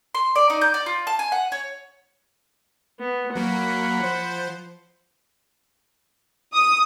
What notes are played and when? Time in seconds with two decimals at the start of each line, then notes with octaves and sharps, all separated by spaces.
0.15 C6
0.36 D5
0.50 D#4
0.61 G6
0.74 D5
0.86 F4
1.07 A5
1.19 G#5
1.32 F#5
1.52 C#5
3.00 B3
3.35 F#3 A#3 F#5 B5
4.00 F3 C5
6.54 D#6